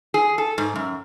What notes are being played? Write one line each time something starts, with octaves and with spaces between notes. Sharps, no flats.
G#4
A4
G#2
F#2